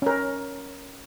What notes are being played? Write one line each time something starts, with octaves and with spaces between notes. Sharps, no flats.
C#4 A#4